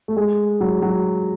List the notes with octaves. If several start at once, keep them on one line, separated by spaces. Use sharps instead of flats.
A3
G#3
F#3
F#3